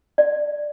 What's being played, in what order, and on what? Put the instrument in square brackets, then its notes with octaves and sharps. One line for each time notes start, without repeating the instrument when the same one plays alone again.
[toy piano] D5